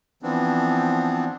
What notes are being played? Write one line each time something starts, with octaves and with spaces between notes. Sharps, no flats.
E3 F3 B3 C4 D4